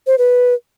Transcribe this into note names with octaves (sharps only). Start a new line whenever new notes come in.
C5
B4